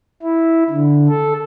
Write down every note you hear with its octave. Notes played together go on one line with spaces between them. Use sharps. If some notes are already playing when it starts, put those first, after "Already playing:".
E4
D3
A4